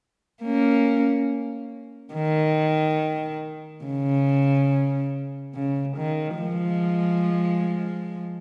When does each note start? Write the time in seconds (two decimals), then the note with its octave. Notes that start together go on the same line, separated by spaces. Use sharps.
0.44 A#3 C#4
2.14 D#3
3.85 C#3
5.55 C#3
5.97 D#3
6.39 F3 G#3